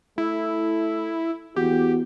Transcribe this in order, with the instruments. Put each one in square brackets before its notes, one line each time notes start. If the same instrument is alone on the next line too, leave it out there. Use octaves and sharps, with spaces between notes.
[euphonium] A3 [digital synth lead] E4
[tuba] E2 [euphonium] F#4 [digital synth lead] G4